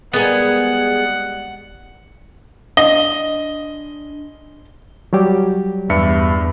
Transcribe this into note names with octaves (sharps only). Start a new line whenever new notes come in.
G3 G#3 B3 G#4 A#4 F#5 G#5
D4 D#5 G7
F#3 G3 G4
E2 G2 E5 C#7